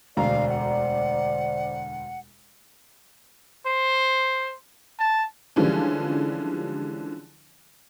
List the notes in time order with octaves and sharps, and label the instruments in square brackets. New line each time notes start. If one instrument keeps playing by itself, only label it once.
[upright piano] E1 D2 A#5 [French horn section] C5 D5 [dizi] F5
[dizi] F#5
[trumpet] C5
A5
[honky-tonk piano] D3 E3 F3 G3 G#3 C#4